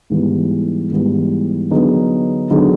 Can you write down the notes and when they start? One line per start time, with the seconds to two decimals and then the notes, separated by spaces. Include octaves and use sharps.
0.10 G#2 E3 G3 B3
0.91 G#2 E3 G3 B3
1.70 D3 F#3 B3 D#4 G#4
2.50 D3 F#3 B3 D#4 G#4